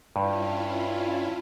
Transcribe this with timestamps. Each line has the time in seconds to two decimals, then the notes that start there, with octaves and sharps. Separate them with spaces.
0.16 G2 C#4 E4 F4